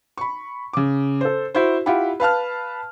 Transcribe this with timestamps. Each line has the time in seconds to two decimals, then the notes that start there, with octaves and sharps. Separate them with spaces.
0.18 B5 C#6
0.73 C#3 D6
1.21 A4 C5
1.54 E4 F#4 C5
1.86 E4 F4 G4 F#5 B5
2.20 B4 F5 A5 F6